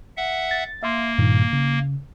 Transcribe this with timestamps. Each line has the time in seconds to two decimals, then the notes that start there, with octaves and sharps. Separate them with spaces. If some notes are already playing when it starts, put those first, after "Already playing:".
0.17 E5 F#5
0.51 A6
0.83 A#3 E5 F5 C6
1.19 G2 A#2 D#3
1.53 C#3